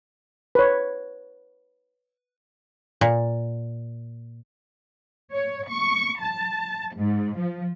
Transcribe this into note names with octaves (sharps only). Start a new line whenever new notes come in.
B4 C#5
A#2
C#5
C#6
A5
G#2
F3